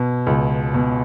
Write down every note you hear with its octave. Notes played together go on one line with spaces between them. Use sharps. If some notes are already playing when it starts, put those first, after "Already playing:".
Already playing: B2
C#2
B2